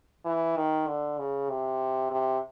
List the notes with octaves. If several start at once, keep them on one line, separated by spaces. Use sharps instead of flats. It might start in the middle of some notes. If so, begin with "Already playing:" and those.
E3
D#3
D3
C#3
C3
C3